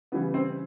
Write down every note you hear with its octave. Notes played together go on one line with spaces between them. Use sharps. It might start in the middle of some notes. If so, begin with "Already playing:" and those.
C#3 E3 G3 B3
C4